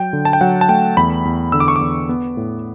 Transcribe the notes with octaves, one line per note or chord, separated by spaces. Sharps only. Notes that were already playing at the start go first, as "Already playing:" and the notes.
Already playing: F#3 G5
D3
A5
G5
F#3 F#5
A5
A3 G5
E2 B5
E2
D3 E6
D6
C#6
D6
E2
B3
A2